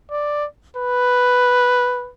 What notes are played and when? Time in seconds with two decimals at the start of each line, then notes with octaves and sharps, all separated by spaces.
0.11 D5
0.76 B4